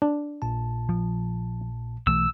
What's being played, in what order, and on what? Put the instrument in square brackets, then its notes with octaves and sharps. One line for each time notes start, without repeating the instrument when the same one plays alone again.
[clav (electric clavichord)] D4
[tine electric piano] A#1 A#2 A5
[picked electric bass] F3
[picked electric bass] B1 E3 A3 [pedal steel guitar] E6